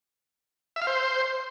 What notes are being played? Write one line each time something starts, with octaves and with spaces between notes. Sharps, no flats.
E5
F5
C5